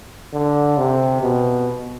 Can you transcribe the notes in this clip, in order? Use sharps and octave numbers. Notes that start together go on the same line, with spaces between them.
D3
C3
B2